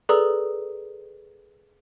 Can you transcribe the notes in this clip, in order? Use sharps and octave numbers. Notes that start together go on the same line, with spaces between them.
G#4 A4 B4 D5 A#5 D#6